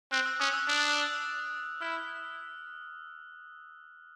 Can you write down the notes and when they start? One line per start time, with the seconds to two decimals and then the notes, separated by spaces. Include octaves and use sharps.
0.11 C4 F#6
0.26 E6
0.40 C#4 D#6
0.54 E6
0.68 D4
1.81 E4 F6